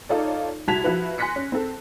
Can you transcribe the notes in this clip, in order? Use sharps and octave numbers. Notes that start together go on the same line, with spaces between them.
D#4 F4 A4 C#5 D5
C2 F#4 A5 G#6 B6 F7
F3 E4 F#4 B4
G#5 C6 F#6 A#6 B6 C#7
C#4
C4 A4